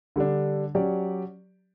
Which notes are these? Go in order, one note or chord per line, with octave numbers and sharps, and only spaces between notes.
D3 G3 D4
F#3 C#4 G4 D5